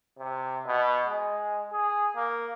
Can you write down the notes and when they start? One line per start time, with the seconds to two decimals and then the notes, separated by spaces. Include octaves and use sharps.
0.18 C3
0.66 B2
1.06 G#3
1.72 G#4
2.16 A#3